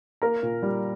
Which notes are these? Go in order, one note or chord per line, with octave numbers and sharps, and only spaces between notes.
A#3 A#4 A#5
A#2
G3